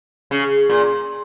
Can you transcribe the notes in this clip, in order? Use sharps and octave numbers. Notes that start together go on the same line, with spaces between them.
C#3
A#2